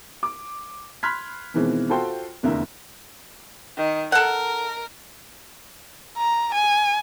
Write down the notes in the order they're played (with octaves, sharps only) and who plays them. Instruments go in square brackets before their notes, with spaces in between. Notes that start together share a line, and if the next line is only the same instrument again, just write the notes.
[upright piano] D6
B5 C6 F6 F#6 G#6 B6
B2 D#3 E3 G#3 C4
F4 F#4 A4 C5 G5 C6
F1 E2 D3 A#3 A#4 E5
[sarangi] D#3
[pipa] A4 F#5 [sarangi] A#4
[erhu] A#5
G#5